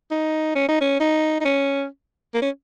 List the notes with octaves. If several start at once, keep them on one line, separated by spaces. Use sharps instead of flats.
D#4
C#4
D#4
C#4
D#4
D#4
C#4
A#3
C#4